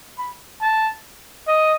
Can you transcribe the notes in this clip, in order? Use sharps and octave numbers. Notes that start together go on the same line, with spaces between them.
B5
A5
D#5